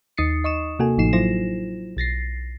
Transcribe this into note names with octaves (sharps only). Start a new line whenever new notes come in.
D#2 D#4 D#6 A6 C7 C#7
D#5 C#6 D#6 E7
C3 A#3 F#4 A4 G#5
A1 A2 F3 D#4 C7 E7
F#3 E4 F4 C5 A#6 E7
B1 A6 A#6 C7